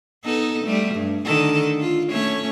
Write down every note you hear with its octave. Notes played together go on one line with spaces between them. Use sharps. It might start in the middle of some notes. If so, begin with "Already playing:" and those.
B3 D#4 A4
G3 A3
G2
D3 D#3 A4
F4
A3 C#4 C#5